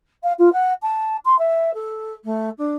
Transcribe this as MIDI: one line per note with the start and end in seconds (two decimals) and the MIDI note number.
0.23 0.33 77
0.38 0.52 65
0.52 0.73 78
0.82 1.16 81
1.25 1.37 84
1.39 1.74 76
1.74 2.13 69
2.24 2.49 57
2.58 2.76 62